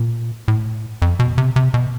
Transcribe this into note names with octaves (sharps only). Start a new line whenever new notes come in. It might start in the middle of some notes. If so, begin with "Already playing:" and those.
Already playing: A#2
A2
F2
B2
C3
C3
B2